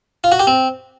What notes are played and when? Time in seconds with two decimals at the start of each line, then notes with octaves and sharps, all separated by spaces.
0.24 F4
0.32 F#4
0.39 G4
0.47 C4